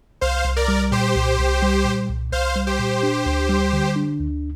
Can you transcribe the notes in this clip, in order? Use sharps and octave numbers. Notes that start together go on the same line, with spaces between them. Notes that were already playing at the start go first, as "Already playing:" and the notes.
C2 C5 F5
C2
A#4 D5
G3
A#2 G4 C5
C2
C2
G3
A#2
C2
C2 C5 F5
G3
G4 C5
A#2
D4
D2
G3
D3
D4
D2